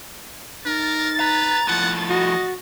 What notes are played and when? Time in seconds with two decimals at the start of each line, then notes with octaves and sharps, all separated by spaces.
0.66 D#4 A#4 A6
1.20 B4 A#5
1.67 A2 F3 F#5
2.10 F#4 D#5